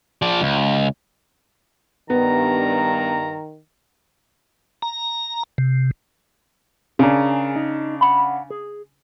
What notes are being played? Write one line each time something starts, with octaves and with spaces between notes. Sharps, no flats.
F3 D5
C#2
G2 D#3 B3 A#5
A#5
C3
C#3 D4 G#4 A#4
D#4
F#5 B5
G#4